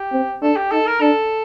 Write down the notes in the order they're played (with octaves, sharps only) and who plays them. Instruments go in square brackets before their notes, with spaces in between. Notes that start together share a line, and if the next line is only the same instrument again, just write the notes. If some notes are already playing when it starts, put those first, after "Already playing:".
Already playing: [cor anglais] G4
[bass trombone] C4
[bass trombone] D4 [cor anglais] A4
[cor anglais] G4
[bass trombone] D#4 [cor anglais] A4
[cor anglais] A#4
[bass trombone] D4 [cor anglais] A4